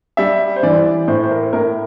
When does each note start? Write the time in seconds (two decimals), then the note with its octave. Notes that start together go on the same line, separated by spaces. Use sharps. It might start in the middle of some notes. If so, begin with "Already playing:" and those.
0.17 G3 E5
0.56 C5
0.63 E3 D5
1.07 A2 C5
1.23 C5
1.31 A#4
1.53 A2 A#4